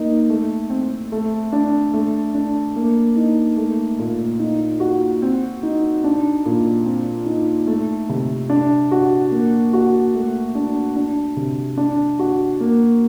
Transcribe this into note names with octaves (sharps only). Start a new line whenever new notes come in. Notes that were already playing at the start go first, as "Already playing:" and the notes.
Already playing: A#3 D#4
A3
C4
A3
D4
A3
D4
A#3
D#4
A3
A#2
D#4
F#4
C4
D#4
D4
A#2
C4
D#4
A3
C3
D4
F#4
A#3
F#4
A3
D4
D4
C3
D4
F#4
A#3